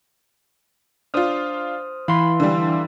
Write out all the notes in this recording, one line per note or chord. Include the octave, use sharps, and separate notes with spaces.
D4 F4 C5 D#6 F6
E3 F5 B5 C6
D3 G3